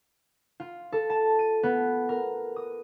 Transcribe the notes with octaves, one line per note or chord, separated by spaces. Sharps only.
F4
A4
A5
D#7
B3
A#4
D#6